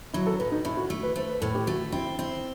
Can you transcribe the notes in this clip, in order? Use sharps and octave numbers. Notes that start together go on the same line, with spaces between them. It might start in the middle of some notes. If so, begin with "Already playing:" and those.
F#3 E4
A4
A2 B4
D#4
A2 E4
F#4
A3
B4
A3 C5
B4
A2 A4
G4
A3 F#4
C4 E4
C4 E4